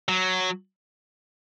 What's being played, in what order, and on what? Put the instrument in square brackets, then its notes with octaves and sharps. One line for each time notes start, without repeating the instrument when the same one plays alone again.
[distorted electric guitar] F#3